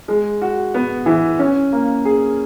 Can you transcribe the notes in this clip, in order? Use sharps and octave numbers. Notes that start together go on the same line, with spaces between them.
G#3
F#4
B3
E3
C#4
A#3
G#4